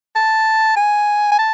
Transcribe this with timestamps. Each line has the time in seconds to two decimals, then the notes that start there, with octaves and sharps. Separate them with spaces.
0.16 A5
0.77 G#5
1.32 G#5
1.39 A5